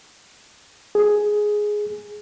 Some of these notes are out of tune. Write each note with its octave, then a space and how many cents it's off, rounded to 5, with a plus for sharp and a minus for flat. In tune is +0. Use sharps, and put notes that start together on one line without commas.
G#4 +5